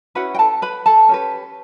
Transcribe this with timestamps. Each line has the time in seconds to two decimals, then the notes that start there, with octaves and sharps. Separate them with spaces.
0.15 C#4 E4 F#4 B4 F#5
0.35 G5
0.39 A4 A5
0.62 B4 B5
0.86 A4 A5
1.09 C#4 G4 B4